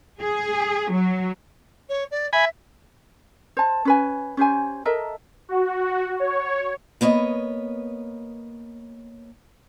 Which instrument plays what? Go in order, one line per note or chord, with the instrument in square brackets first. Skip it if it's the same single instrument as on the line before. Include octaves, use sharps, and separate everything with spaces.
[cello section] G#4
F#3
[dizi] C#5
D5
[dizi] E5 [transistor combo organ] G#5 B5
[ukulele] C5 A5
C#4 B4 G#5
C#4 G4 C5 G#5
A4 A#4 D#5 E5
[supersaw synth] F#4
C#5
[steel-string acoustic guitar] A#3 B3 C#5 D#5